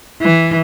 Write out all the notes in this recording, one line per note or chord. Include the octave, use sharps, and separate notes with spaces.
E3